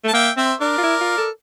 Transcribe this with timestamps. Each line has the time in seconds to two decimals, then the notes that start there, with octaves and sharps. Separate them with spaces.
0.04 A3 A5
0.13 A#3 E5 G5
0.37 C4 C5 E5
0.61 D4 A#4 D5
0.78 F4
0.83 E4
1.01 F4
1.18 A4